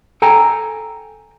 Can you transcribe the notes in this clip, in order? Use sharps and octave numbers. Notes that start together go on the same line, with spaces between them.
A4 G5 G#5 A#5